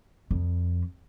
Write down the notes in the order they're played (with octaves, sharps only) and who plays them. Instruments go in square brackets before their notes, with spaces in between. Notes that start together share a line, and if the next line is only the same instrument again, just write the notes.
[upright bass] F2